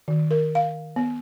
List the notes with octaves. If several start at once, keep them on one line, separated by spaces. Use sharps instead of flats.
D#3
A#4
F5
B3